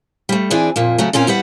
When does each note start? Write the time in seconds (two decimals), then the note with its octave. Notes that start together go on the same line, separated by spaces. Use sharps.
0.29 G3 A3
0.50 E3 C4 D4 G#4 D5
0.76 F2 A#2 A#3
0.98 C#3 F#3 A3
1.13 A#2 C4 C#4 F4 A#4
1.27 E2 G3 B4 F#5